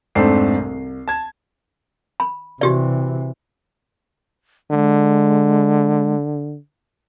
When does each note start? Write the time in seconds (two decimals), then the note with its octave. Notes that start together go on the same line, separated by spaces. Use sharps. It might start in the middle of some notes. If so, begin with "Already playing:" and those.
0.15 F1 G#2 A3 C4 D4 C7
0.57 C2
1.08 A5 G#6
2.20 B5
2.61 C3 E3 F#4 G4 D5
4.71 D3 G#3